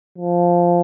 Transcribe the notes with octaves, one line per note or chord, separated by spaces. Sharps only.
F3